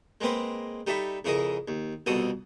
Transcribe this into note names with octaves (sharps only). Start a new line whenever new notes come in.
G#3 A#3 C4 B4 F#5
G3 D#4 A4 E5 B5 C#6
F2 C#3 E4 G#4 A#4 D#5
D#2
C2 F2 B2 F#4 A4 D#6